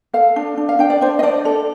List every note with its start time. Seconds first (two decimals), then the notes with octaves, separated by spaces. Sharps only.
0.14 A4 F5
0.36 D4
0.57 D4
0.69 F5
0.79 D4 G5
0.90 D5
1.01 D4 C5
1.19 D#5
1.23 D4 D5
1.45 A4